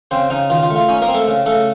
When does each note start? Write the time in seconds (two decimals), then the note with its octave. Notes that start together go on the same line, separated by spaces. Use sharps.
0.11 C#3 C4 C5
0.30 C#3 D#4
0.50 D#3 F4
0.63 F4
0.70 A3
0.76 F4
0.89 C#4 D#4 C#5
1.02 A#3 A#4
1.08 C4
1.14 A3 A4
1.27 C#3
1.46 C#3 A3 A4